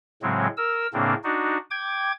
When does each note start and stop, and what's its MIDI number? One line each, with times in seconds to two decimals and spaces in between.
0.22 0.47 45
0.22 0.47 49
0.22 0.47 54
0.22 0.47 56
0.22 0.47 60
0.57 0.87 70
0.57 0.87 88
0.94 1.14 45
0.94 1.14 49
0.94 1.14 58
0.94 1.14 60
0.94 1.14 62
1.24 1.58 62
1.24 1.58 63
1.24 1.58 66
1.71 2.12 79
1.71 2.12 86
1.71 2.12 92